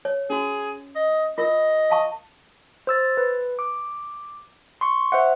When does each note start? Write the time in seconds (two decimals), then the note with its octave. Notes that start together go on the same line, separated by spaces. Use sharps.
0.05 C#5
0.30 C#4 F#4 G#4
0.95 D#5
1.38 F4 A#4 D#5
1.90 F5 A5 C#6
2.87 C5 E6 A6
3.17 B4
3.59 D6
4.81 C6 C#6
5.12 C5 E5 F#5